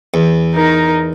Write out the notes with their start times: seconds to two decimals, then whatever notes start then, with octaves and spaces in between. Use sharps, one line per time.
0.14 E2
0.54 D#4 A#4